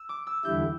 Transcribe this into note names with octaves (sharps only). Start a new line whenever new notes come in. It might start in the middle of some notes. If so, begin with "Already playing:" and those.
Already playing: E6
D6
E6
E2 D3 G3 E4 G6